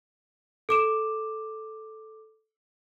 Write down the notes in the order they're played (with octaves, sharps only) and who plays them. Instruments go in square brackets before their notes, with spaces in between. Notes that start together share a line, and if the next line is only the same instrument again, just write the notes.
[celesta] A4 D6 E7